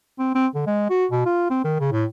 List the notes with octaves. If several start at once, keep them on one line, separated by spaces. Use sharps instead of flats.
C4
C4
D3
G#3
F#4
B2
F4
C4
D#3
C#3
A2